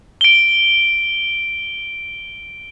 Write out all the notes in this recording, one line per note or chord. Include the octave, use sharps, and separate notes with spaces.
D7 G7